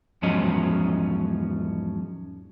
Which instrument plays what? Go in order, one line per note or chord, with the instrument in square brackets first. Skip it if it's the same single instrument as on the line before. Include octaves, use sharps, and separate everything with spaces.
[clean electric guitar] E2 G#2 F3 F#3 C#4 D#5